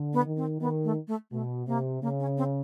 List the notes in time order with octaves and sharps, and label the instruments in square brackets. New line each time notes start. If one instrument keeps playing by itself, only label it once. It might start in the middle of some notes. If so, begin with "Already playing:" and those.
Already playing: [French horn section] D3
[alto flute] B3
[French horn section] D#3
[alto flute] C4
[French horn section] D#3 [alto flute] B3
[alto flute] A3
A3
[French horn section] B2 [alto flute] A3
[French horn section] C3 [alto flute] A#3
[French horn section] C#3 [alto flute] A#3
[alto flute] C#4
C4